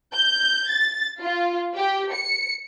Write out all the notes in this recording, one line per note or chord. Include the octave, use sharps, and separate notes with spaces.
G6
A6
F4
G4
C#7